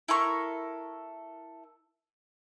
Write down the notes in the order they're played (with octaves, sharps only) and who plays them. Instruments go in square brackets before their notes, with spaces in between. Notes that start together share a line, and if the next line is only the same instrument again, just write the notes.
[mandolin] E4 A4 A#4 C#6